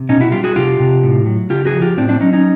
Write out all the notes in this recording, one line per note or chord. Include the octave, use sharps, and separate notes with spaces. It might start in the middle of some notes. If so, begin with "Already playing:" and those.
Already playing: C3
B2 C#4 D#4
E4 F#4
G3 F4 G4
F#4 G#4
C3 F4 G4
C3
A2
F#3
C#3 F4 G4
F#4 G#4
F3
F4 G4
A2 C4 D4
C4 D4
F#3 C#4 D#4
C#4 D#4